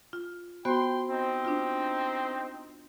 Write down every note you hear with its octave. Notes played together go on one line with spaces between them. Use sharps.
F4
B3 F#4 C5 G5 C6
C4 D#4
D4 F4